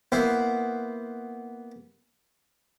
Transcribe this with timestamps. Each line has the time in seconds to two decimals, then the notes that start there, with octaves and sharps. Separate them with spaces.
0.12 A#3 B3 E4 C5